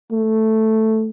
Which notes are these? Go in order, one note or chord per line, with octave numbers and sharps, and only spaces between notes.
A3